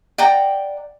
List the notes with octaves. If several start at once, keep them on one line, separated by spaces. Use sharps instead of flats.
D5 F#5 G5 A#5